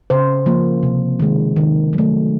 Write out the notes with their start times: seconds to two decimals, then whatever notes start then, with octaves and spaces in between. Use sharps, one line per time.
0.10 C#3 C5
0.46 F3 A#3
0.83 C3
1.20 D#3 G#3
1.56 D#3
1.93 F#3
1.98 A3